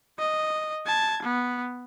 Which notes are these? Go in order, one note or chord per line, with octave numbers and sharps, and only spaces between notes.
D#5
A5 G#6
B3